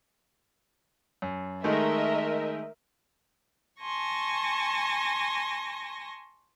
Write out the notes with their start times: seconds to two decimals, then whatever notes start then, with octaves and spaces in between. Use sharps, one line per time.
1.22 F#2
1.64 D#3 G#3 A3 A#4 D#5 E5
3.81 G#5 A5 C6 C#6 A#6